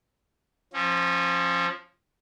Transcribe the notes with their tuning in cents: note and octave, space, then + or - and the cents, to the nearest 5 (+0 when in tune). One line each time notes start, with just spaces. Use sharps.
F3 +5 C#4 -30